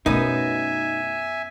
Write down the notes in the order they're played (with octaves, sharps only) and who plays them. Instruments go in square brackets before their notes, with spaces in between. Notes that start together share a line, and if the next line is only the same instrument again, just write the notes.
[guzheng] F#2 B3 [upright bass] B2 A3 [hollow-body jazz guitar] D#4 [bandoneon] E5 G#5